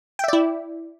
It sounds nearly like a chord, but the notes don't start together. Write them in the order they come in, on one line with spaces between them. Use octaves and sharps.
G5 E5 D5 E4